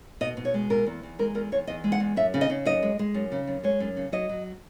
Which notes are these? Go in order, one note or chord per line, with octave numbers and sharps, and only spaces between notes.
B2 D#5
B2
C#5
G#3
B2 A#4
E2
E2
G#3 A#4
E2 A#4
E2 C#5
E2 D#5
G#3
F#5
E2
F#2 E5
C#3
D#5
C#3
F#2 D#5
G#3
G#3
F#2
C#3
F#2
G#3 C#5
F#2
C#3
F#3 D#5
F#3